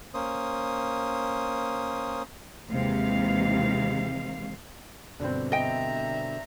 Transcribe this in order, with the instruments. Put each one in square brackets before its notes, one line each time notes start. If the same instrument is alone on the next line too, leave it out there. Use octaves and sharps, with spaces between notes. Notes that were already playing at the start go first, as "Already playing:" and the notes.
[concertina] A#3 C#4 C5 D#6
[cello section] D#2 C3 E3 G#3 F5
[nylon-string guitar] G2 B2 D3 [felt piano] C4 D4
[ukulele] D#5 G5 [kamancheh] E5 A#5